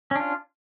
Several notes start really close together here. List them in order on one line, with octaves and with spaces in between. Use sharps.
C#4 D4 F4